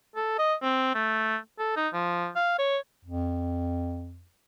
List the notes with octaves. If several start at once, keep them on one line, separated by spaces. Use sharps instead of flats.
A4
D#5
C4
A3
A4
D#4
F3
F5
C#5
F2